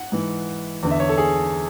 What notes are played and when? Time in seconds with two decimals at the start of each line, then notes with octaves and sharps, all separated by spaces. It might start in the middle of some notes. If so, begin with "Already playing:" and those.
Already playing: F#5
0.12 G#2 E3
0.83 E2 D3
0.91 E5
1.00 C#5
1.09 A4
1.18 G#4